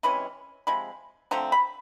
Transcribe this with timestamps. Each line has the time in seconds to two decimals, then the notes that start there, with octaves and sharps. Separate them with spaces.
0.03 C3 E3 G#3 C#4 B5
0.67 C3 F3 G#3 B5
1.31 D3 F3 A3 C4 A#5
1.52 B5